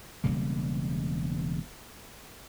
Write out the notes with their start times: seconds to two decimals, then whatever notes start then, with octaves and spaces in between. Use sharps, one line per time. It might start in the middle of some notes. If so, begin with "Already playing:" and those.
0.24 E1 C#3 G3 A#3